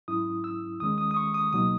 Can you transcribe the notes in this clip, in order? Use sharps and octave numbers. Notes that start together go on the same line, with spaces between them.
G#2 F#3 C#4 E4 D#6
E6
D#2 D#3 G#3 C#4 D#6
D#6
D#6
C#6
D#6
C#2 B2 F#3 A#3 D#4 D#6